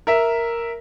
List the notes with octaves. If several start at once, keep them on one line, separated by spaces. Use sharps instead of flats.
A#4 E5